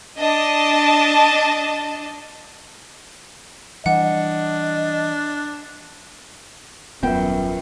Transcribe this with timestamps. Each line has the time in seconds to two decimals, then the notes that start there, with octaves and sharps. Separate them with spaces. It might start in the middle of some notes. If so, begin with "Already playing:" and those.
0.18 D4 D#5 A5
3.86 E3 G3 D4 D#5 F#5
7.03 D#1 F#2 B3 F4 A#4 B4 E5 G5